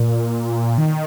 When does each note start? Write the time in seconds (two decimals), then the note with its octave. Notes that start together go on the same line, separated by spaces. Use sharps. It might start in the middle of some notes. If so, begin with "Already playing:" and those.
Already playing: A#2
0.78 D#3